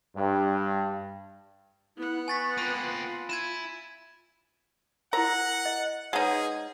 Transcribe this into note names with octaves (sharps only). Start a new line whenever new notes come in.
G2
B3 E4 F#5
G#5 C#6 A6 B6
A#3 C4 F4 B5 D#7
E4 G#6 D#7 E7
E4 A#4 F#5 A#5
D#5
G#3 D#4 G#4 B4 C#5 F#5